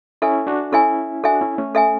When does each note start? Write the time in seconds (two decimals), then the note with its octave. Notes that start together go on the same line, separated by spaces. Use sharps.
0.22 C#4 E4 A4 E5 G#5
0.47 D4 F#4
0.72 C#4 E4 A4 E5 G#5
1.24 D4 F#4 A4 E5 G#5
1.41 C#4 E4
1.58 A3 C#4
1.75 A4 E5 G#5